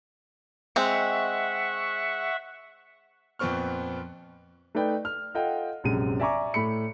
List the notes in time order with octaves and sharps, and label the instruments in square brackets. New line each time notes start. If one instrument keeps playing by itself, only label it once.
[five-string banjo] G#3 C4 [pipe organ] E5 F#5 C#6
[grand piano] F2 A#2 B3 C4 C#6 F6
A3 D#4 B4 D5 G5
F6
F4 A4 D#5 F#5 G5
A#1 F#2 C3 G#3 D#7
D5 E5 G#5 A#5 C#6 D6
A2 A3 B5 C#7